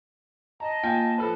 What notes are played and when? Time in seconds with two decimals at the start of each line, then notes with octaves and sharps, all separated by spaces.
0.60 D#5 A5 A#5
0.83 A#3 F4 G5 G#5
1.18 F3 A4 B4 A5